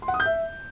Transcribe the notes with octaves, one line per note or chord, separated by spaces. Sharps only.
C6
F#5
D#6
G6
E5